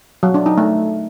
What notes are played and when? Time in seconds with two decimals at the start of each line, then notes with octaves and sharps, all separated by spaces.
0.23 F#3
0.34 D4
0.46 D#4
0.58 A3